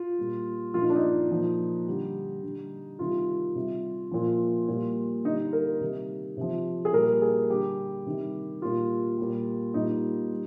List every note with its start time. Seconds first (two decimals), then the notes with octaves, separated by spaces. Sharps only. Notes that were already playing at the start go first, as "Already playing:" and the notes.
Already playing: F4
0.18 A#2 G3
0.74 A#2 F3 F4
0.81 D#4
0.89 D4
0.96 D#4
1.30 A#2 F3
1.87 D3 G3
2.43 D3 G3
2.99 C3 D#3 G3 F4
3.55 C3 G3
4.11 A#2 F3
4.68 A#2 G3
5.25 D3 G3 D#4
5.53 A#4
5.81 C3 D#3 G3
6.37 C3 F3
6.85 G#4
6.93 A#2 G3 A#4
7.22 G#4
7.50 D3 G3 G4
8.06 C3 D#3 G3
8.62 A#2 G3 F4
9.18 A#2 G3
9.74 A#2 G3 D#4
10.31 G3